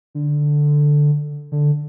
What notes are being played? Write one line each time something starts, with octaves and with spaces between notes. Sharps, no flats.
D3
D3